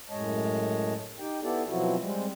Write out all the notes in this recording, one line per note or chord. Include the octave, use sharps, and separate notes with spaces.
F#2 A2 G#3 C#5 D#5 A5
D#4 G4 G5
B3 E4 G4 A4 D5
B2 F3 F#3 C4 E4 F#4
G3 G#3 C4